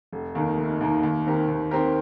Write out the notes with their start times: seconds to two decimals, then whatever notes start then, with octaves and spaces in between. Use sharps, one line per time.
0.13 F1
0.35 D#2 D#3 A#3 D#4
0.58 F1
0.80 D#2 D#3 A#3 D#4
1.03 D#2
1.26 D#3 C4 G4 A#4
1.48 D#2
1.71 D#3 C4 G4 A#4